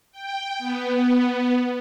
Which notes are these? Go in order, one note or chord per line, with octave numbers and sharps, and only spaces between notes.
G5
B3